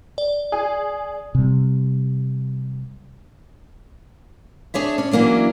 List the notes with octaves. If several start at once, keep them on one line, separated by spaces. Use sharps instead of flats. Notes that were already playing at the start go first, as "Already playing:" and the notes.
D5
G#4
C3 G3
D4 G#4 C#5 E5
C#4 D4
E3 F#3 A#3 C#4 D4